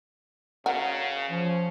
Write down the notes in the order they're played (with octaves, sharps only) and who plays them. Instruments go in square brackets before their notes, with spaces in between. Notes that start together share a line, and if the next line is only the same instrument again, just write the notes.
[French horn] C#3 [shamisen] F#4 A#4
[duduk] F3 [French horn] C#4